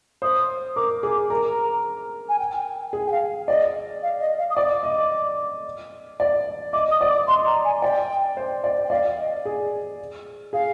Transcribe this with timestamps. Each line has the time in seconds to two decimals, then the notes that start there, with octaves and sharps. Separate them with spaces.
0.22 C5 D#6
0.76 A#4 D6
1.03 G#4 D6
1.30 A#4 A#5
2.29 G#5
2.39 G5
2.57 G5
2.93 G#4
3.07 G5
3.12 F5
3.48 D5 D#5
4.03 F5
4.20 D#5
4.38 F5
4.50 D#6
4.57 D5 D6
4.83 D#5
6.20 D5
6.73 D#5 D6
6.91 D#6
7.01 D5
7.10 D6
7.28 D#5 C6
7.46 A#5
7.64 G#5
7.82 D5 G5
8.37 C5
8.64 D5
8.84 G5
8.90 D5 F5
9.18 D#5
9.45 G#4
10.53 G#4 F5